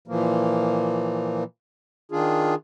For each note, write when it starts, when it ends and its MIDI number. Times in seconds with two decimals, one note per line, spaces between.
0.08 1.44 46
0.08 1.44 52
0.08 1.44 53
0.08 1.44 58
2.12 2.55 51
2.12 2.55 62
2.12 2.55 65
2.12 2.55 68